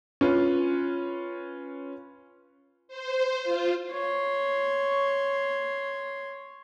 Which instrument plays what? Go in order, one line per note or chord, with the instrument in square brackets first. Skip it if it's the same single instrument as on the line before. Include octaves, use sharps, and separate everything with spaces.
[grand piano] C#4 F4 B4
[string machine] C5
F4
[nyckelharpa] C#5 C6